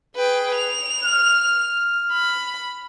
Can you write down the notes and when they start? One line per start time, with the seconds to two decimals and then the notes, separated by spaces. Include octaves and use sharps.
0.15 G#4 B4 G5
0.55 F7
1.04 F6
2.12 B5